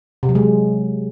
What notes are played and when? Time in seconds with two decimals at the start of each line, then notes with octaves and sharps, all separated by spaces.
0.23 C3
0.29 F#3
0.35 G#3